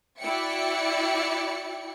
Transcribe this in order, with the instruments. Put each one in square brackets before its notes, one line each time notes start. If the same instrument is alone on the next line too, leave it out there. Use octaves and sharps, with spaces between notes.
[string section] E4 F#4 D5 E5 G5 C#7